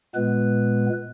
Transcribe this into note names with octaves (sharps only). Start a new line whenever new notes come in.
A#2 G#3 B3 B4